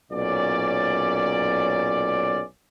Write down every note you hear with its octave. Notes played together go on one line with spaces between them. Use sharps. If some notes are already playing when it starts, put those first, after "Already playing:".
B1 A#2 C#4 D5